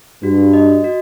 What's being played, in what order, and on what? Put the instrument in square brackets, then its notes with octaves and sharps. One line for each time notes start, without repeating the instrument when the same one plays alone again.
[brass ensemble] G2 [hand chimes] F#4
[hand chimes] D#5
F#4